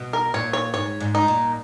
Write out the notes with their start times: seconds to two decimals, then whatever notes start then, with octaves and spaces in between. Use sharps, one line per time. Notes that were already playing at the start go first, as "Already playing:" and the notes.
Already playing: B2
0.13 A#4
0.34 A#2 C#5
0.53 C#5
0.74 G#2 C#5
1.00 G#2
1.15 D#4
1.28 A#2